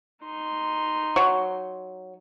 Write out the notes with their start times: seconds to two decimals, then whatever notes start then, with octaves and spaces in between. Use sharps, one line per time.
0.24 D#4 C6
1.16 F#3